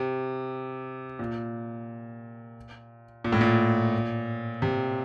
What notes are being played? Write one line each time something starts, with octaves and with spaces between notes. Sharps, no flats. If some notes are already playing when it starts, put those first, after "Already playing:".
Already playing: C3
A#2
A#2
A2
A#2
C3